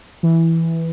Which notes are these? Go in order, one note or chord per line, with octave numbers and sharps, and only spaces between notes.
E3